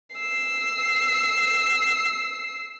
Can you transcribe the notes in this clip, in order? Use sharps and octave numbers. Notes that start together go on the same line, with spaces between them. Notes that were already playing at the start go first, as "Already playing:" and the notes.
E6 C7